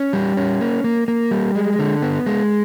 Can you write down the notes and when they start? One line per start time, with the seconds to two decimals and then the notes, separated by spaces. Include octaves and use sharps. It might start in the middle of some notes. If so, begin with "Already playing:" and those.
Already playing: C#4
0.13 G3
0.37 C#4
0.61 A#3
0.84 A#3
1.08 A#3
1.31 G3
1.55 G#3
1.79 D3
2.02 B3
2.27 G#3